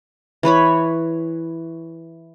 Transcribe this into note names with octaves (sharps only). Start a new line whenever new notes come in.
E3 B4 C#5 B5